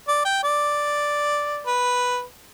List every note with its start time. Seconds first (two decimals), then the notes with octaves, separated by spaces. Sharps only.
0.08 D5
0.25 G5
0.44 D5
1.67 B4